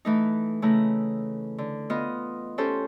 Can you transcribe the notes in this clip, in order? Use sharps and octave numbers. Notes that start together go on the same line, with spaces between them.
E3 A3 D#4
C#3 A3 E4 A#5
D3
B3 F4 D#5
C#4 G4 A4 C5